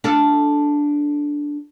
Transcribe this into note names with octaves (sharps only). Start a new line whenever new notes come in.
D4 F4 A4